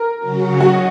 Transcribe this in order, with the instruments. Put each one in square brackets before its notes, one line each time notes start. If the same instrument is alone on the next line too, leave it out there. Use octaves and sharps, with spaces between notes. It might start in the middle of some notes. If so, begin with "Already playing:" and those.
Already playing: [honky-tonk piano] A#4
[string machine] C#3 F#3 C#4 F#4
[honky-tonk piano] F#4 [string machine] D#5